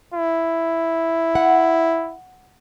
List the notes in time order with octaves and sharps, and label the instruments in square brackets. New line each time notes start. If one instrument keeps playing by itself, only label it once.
[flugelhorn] E4
[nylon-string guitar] F#5